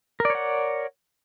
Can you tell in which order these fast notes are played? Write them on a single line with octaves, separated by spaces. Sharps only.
A#4 D5 C#5 F#5